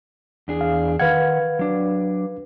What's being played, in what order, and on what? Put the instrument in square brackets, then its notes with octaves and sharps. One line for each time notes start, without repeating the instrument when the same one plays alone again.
[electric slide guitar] E2 D4 G#4
[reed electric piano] F5
[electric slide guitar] D#3 F#5 [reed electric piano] B4 F5 G#6
[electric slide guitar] F#3 D4